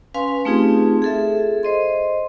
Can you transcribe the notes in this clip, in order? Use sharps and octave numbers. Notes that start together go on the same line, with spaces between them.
C#4 B4 F5 G#5 C6
A3 C4 D#4 F4 G4 G#4
G#4 A4 E5
C5 D#5 C6